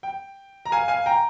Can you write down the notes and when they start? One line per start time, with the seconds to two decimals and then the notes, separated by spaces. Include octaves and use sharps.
0.03 G5
0.66 A#5
0.72 F5 G#5
0.88 F5 G#5
1.06 G5 A#5